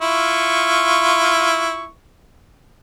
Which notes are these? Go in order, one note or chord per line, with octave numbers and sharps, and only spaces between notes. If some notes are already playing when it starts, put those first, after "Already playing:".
E4 F4 C#6